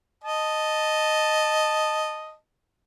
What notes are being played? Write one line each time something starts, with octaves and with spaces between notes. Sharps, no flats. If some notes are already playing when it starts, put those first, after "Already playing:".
D#5 A5